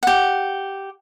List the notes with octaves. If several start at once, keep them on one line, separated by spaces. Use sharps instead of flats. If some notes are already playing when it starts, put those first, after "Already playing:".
G4 F#5